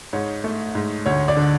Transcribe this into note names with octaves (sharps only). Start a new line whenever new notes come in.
G#2 C#5
A3
G#2
D2 C#5
D5
D3